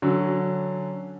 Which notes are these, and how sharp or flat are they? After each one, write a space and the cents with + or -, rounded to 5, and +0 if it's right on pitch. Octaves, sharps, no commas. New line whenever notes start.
D3 +0 F#3 +0 C#4 +0